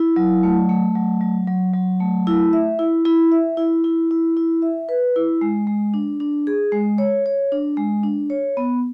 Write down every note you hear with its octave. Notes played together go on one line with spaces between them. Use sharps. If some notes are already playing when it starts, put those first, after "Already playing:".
Already playing: E4
F#3
A3
A3
F#3
F#3
F#3
F#3
A3
E4
E5
E4
E4
E5
E4
E4
E4
E4
E5
B4
E4
G#3
G#3
D4
D4
G#4
G#3
C#5
C#5
D4
G#3
D4
C#5
B3